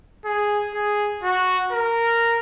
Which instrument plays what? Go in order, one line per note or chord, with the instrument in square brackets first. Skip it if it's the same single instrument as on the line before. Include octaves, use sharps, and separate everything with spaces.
[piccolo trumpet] G#4
G#4
F#4
A#4